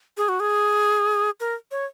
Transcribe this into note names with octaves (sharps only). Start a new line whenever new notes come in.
G#4
F#4
G#4
A#4
C#5